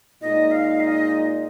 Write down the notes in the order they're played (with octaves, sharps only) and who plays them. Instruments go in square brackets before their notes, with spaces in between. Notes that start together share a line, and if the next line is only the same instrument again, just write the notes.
[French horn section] A#2 G#3 D#4 [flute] D#5
[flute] F5
D#5